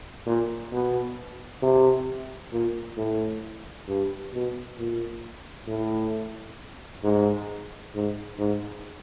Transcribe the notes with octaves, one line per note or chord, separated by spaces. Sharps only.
A#2
B2
C3
A#2
A2
G2
B2
A#2
A2
G#2
G#2
G#2